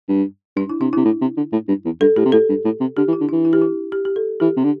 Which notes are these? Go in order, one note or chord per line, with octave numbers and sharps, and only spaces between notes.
G2
G2 D4
E4
C3 D4
C3 E4
A2
C3
D3
A2
G2
E2
G2 A4
A2 G4
C3
A2 A4
G2
A2
C3
D3 G4
E3
E4
D3
D4
E3
E4
G4
E4
G4
G4
A4
E3 G4
C3
D3